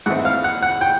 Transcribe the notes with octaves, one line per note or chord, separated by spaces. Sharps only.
G#2 E3 A3 C4 F#5
F5
F#5
F#5
G5